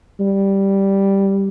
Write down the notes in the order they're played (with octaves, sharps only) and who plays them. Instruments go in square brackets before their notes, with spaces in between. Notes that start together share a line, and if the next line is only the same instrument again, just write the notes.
[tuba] G3